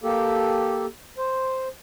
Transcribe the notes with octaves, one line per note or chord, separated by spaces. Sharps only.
A#3 G4 A4
C5